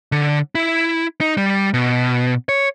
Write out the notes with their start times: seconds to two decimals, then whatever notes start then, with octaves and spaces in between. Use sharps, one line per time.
0.12 D3
0.55 E4
1.21 D#4
1.37 G3
1.74 B2
2.49 C#5